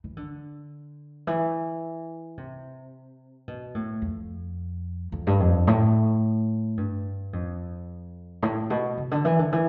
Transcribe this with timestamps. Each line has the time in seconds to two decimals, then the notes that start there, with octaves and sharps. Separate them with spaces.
0.04 E3
0.17 D3
1.27 E3
2.38 C3
3.48 B2
3.75 A2
4.02 F2
5.12 F2
5.27 G2
5.40 F2
5.67 A2
6.77 G2
7.33 F2
8.42 A2
8.70 B2
8.98 C3
9.11 D3
9.25 E3
9.39 D3
9.52 E3